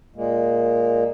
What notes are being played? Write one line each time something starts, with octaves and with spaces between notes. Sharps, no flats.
A#2 G#3 A#3